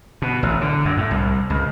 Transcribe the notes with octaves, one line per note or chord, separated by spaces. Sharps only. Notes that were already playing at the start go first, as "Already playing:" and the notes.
B2
A1
D3
F#2
A2
C2
C#2